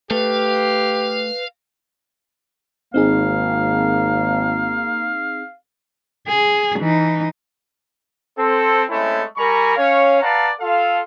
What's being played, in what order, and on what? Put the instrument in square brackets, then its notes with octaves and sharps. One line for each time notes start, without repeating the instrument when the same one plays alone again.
[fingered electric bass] A3 [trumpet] G4 [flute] B4 [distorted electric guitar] F5
[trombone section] G#1 [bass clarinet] A#3 [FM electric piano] C4 D#4 G#4 [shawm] F5
[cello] G#4
E3 D#4
[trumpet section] C4 A4
G#3 A3 C4 C#4 E4
G3 A#4 G#5 A#5 B5 C#6
C#4 C#5 F5
B4 D5 F5 F#5 A5 A#5
F4 A4 F5